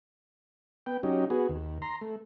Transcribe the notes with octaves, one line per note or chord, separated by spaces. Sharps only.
B3 G5
F#3 C#4 D#4 G4
B3 F#4 G#4
D#2
A#5 C6
A3